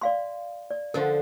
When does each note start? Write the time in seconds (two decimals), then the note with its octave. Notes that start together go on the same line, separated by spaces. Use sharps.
0.01 D5 F5 C6
0.70 D5
0.94 D3 F3 A#4 C5 C6